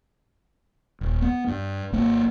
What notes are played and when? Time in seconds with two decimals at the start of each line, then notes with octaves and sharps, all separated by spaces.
1.01 D#1
1.22 B3
1.47 G2
1.92 G#1 A#3